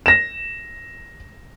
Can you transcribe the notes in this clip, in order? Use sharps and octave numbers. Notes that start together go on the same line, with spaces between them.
A#6 E7